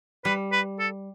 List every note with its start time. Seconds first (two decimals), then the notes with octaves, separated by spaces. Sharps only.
0.25 G3 B4
0.52 B4
0.79 A4